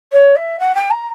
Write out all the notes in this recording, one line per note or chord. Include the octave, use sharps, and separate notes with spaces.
C#5
E5
F#5
G5
A#5